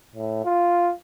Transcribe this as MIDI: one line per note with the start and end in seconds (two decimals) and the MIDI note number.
0.16 0.41 45
0.45 0.91 65